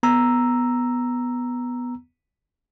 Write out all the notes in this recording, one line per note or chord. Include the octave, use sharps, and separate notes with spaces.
B3 A#5 E6